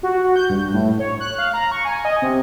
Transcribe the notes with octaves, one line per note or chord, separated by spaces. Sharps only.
F#4
G6
G2
A2
C#5
F#6
F5
A#5
C#6
G#5
D#5
C3